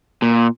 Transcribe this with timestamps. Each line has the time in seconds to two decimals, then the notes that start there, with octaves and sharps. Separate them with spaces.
0.22 A#2